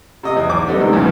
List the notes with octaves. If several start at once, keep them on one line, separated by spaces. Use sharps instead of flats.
C3 D#5 D#6
E2
B1 E2 D6
G3 B3 D4 A4 C5 D#5
G#2 C3 D#3
B1 G2 C#3 E3 F3